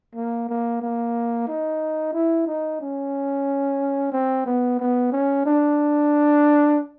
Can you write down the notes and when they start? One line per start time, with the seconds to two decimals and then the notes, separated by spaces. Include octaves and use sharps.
0.15 A#3
0.49 A#3
0.82 A#3
1.48 D#4
2.14 E4
2.47 D#4
2.81 C#4
4.12 C4
4.46 B3
4.79 B3
5.12 C#4
5.46 D4